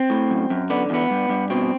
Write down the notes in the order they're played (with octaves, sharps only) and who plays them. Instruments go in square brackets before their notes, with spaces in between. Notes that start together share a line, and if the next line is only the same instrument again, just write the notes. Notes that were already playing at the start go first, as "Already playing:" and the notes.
Already playing: [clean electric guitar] C4
A2
F#2
F#2
D3 B3
E2 B3
G2
G2
B2 C4